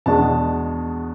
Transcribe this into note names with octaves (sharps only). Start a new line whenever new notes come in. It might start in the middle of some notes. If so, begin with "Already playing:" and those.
E2 B2 G#3 D4 A5